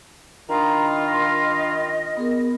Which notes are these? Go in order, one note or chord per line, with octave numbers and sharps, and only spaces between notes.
D#3 D4 F4 A#5 B5 D#6
D#5
B3 G#4 A#4